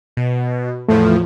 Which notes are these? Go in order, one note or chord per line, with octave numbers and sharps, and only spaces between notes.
B2
E2 A2 F3 A3